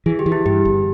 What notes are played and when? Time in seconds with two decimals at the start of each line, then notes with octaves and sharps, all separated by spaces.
0.06 E3 G#4
0.19 G4
0.26 E3
0.32 E4
0.46 G2 G4
0.65 G1